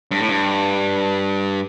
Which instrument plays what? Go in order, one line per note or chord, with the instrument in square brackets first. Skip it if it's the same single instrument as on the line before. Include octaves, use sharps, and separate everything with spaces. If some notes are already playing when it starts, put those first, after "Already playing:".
[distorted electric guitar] G2
A2
G2